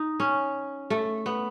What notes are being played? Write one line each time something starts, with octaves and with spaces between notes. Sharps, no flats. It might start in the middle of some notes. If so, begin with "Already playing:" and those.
Already playing: D#4
C#4
A3
B3